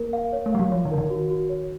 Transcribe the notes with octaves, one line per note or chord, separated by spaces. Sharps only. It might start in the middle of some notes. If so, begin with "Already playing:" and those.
Already playing: A#3 A#4
F5
C#5
A3
G3 F5
F#3
F3 C#5
D#3
D3 A#4
D#3
F#4
F#4
C#5